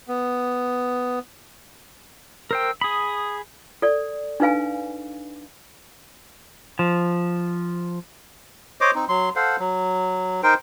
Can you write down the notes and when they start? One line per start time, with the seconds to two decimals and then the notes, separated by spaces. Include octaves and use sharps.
0.08 B3
2.51 A#4 C5 G5 E6
2.81 G#4 B5 D#6
3.82 A4 D5
4.40 D4 D#4 B4 F5 G#5
6.79 F3
8.81 C5 C#5 D#5 D6
8.95 C4 D#4
9.09 F#3 C6
9.36 A4 C5 F5 F#5
9.59 F#3
10.43 D#4 A#4 C5 G5